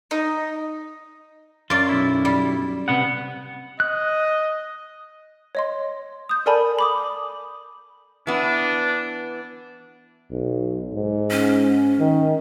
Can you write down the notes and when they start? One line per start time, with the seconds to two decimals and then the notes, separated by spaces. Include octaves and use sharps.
0.11 D#4
1.70 F#2 F4 D5
1.89 B1 E4
2.25 G3
2.88 C3 B3 F#5
3.80 D#5 F#6
5.55 C#5 D#5 C6
6.29 D#6 G6
6.46 A4 A#4 D5 G#5 A5 B5
6.79 B5 D6 D#6
8.27 E3 B3 D4
10.31 B1
10.94 G#2
11.30 C#4
11.99 D#3